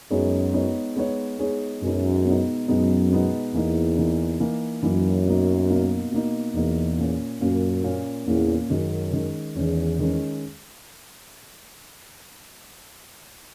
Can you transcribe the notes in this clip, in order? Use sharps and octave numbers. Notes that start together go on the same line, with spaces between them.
F#2 G#3 B3 D#4 G#4 C#5
G#3 B3 D#4 G#4 C#5
G#3 B3 D#4 G#4 C#5
G#3 B3 D#4 G#4 C#5
F#2 B2 G#3 B3 D#4
B2 G#3 B3 D#4
F#2 B2 G#3 B3 D#4
B2 G#3 B3 D#4
E2 E3 A#3 D#4
E3 A#3 D#4
E3 A#3 D#4
F#2 E3 A#3 D#4
B2 A#3 D#4
B2 A#3 D#4
B2 A#3 D#4
E2 B2 A#3 D#4
A#2 A#3 C#4
F#2 A#2 A#3 C#4
A#2 A#3 C#4
E2 A#2 A#3 C#4
F#2 D#3 G#3 C#4
D#3 G#3 C#4
E2 D#3 G#3 C#4
D#3 G#3 C#4